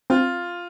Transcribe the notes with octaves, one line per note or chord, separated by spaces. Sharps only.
C4 F4